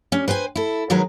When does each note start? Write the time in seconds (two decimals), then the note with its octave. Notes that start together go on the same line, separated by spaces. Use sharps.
0.12 G3 C#4
0.28 B4 C5 G5 G#5
0.56 E4 A4
0.90 D#3 F#3 G#3 A#4 B4 C#5